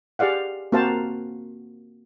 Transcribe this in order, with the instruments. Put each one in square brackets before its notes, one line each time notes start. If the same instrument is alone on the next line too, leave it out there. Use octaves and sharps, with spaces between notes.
[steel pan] G4 G#4 D5 F5 F#5
A#3 C4 F#4 C5 F5 A5